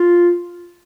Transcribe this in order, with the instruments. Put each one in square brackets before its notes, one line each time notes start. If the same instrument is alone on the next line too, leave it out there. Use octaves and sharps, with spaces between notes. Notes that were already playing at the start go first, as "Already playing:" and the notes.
Already playing: [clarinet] F4